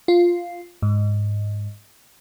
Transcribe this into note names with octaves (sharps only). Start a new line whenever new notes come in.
F4
G#2